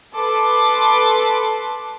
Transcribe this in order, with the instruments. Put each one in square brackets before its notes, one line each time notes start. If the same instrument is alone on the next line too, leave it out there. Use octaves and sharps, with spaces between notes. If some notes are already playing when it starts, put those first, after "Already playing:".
[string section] A4 B4 C6 D6